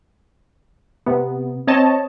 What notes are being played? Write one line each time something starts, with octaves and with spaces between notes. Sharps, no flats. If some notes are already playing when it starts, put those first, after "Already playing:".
C3 B3
C4 C#5 D#5 A5